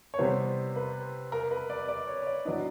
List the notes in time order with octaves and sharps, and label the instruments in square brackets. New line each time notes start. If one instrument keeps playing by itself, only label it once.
[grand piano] C#5
[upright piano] C3 E3 G3 B3 [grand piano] C5
[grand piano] B4
A#4
B4
D5
D5
C#5
C#5
D5
[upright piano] A2 F#3 B3 D4 [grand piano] D#5